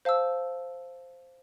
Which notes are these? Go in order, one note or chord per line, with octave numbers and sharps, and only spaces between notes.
C5 F5 A5 E6